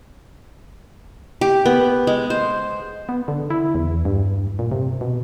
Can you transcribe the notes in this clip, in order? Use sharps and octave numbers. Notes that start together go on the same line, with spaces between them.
G4
B3
G#3
C5
B3
D3
E4
E2
G2
A#2
C3
B2